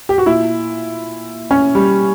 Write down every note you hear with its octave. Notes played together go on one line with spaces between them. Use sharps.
G4
F#4
A#2 E4
C#4
G3